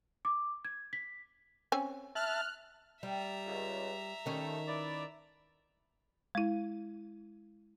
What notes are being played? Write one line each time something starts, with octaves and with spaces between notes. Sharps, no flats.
D6
G#6
B6
C4 C#4 G#5
E5 A5 F6 F#6
G3 E5 A#5
C#2
D#3 G3 A3 C#4
E4 B4 D5
G#3 E4